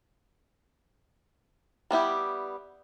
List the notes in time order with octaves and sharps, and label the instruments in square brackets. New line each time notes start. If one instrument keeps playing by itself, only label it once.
[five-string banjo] G3 B3 E4 G4